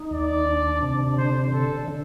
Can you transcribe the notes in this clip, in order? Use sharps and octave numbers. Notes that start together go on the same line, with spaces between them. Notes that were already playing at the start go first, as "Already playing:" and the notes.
Already playing: D#4
D#2 D5
D4
C3
D3 C5
D3 A4
D3